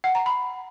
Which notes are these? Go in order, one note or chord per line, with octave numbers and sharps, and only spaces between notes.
F#5
A#5
B5